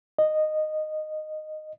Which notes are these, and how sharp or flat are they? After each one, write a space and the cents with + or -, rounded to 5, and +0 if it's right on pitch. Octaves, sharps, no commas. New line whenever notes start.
D#5 -10